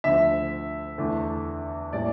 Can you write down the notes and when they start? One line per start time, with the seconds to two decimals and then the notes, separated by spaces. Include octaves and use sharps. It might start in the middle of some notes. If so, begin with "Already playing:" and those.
0.04 D2 D3 F3 E5
0.98 E2 D3 A3 D4
1.93 A2 G3 A#3 C#4 D5